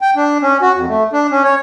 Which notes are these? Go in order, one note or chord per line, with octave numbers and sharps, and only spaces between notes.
G5
D4
C#4
F#4
F2
A3
D4
C#4
C#5